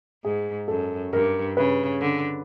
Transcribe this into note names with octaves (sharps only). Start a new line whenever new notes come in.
G#2 G#4
F#2 A4
G2 A#4
C#3 B4
D3